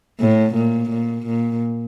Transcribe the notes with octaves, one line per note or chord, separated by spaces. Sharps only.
A2
A#2
A#2
A#2